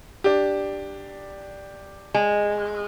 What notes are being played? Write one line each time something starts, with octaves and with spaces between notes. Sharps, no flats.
D4 G4
G#3